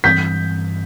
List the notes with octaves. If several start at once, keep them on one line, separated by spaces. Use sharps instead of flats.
G2 E3 G3 C4 G6 B6